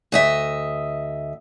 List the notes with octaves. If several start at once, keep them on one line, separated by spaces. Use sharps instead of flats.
D2 D#5 E5